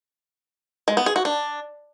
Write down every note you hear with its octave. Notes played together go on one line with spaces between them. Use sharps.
G#3
B3
G#4
F#4
D4